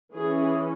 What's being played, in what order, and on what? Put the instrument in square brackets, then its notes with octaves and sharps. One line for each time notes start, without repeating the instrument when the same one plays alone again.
[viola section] E3 C#4 G#4